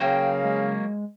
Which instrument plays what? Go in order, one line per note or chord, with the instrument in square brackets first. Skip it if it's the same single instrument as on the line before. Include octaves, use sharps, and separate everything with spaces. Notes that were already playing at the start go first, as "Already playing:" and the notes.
[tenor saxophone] C#3 [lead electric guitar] F#3 A#3 [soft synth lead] G5
[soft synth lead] G#3